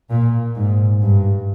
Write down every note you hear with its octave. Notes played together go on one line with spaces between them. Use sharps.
A#2
G#2
G2